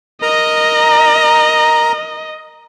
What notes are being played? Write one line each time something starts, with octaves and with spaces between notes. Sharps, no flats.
A#4 D#5 A#5